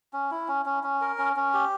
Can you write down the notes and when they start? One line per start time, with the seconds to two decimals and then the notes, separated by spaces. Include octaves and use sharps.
0.13 C#4
0.31 E4
0.48 C#4
0.66 C#4
0.83 C#4
1.01 A#4
1.18 C#4
1.36 C#4
1.54 G4